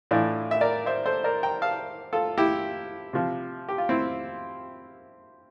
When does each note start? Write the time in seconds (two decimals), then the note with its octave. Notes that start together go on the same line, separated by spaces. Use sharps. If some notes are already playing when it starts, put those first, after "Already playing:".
0.11 A2 E3 D4 F4
0.51 E5
0.61 A#4 D5
0.86 C5 E5
1.06 A4 C5
1.24 A#4 D5
1.43 G5 A#5
1.62 F5 A5
2.13 F4 A4
2.38 E4 G4
3.13 C3 F3
3.68 G4
3.78 F4
3.89 C4 E4